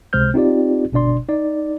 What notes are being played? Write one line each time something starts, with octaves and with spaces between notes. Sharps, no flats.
C#2 C3 G#3 C5 F6 G6
C4 D#4 F4 G4 D5
G1 B2 D4 D5 C6
D#4 D5